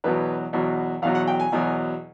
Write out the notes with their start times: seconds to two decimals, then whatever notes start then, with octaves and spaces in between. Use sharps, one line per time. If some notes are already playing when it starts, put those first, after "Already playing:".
0.04 E2 B2 F#3 B4
0.53 E2 B2 F#3
1.02 E2 B2 F#3 F5
1.15 F#5
1.27 G5
1.40 G#5
1.52 E2 B2 F#3